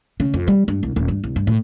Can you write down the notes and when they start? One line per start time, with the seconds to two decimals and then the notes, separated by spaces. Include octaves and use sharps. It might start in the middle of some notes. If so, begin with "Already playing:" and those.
0.20 C#3
0.34 F2
0.48 G3
0.68 G2
0.83 C2
0.96 D#1
1.08 G2
1.24 C2
1.36 G2
1.47 A2